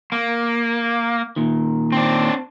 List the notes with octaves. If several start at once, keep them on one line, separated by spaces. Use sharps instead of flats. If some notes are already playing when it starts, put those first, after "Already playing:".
A#3
A#2 D#3
C4 D4